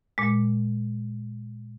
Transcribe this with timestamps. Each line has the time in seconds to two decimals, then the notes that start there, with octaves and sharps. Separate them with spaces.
0.18 A#2 G#3